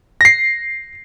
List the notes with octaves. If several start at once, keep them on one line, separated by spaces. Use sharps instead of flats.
A#6 C7